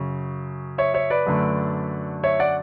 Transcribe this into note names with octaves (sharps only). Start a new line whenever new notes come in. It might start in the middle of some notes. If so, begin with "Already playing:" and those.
Already playing: F#2 C#3
C#5 E5
C#5 E5
B4 D5
F#2 D3 A3
C#5 E5
D5 F#5